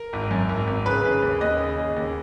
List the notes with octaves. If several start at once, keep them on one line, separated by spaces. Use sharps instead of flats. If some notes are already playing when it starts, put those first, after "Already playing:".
Already playing: A#4
G#1
F#2
G#1
G#1
C#3 B4
C#3
D#2
D#2 D#5
C#3
C#3
D#2